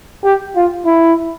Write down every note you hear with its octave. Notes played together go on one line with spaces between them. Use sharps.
G4
F4
E4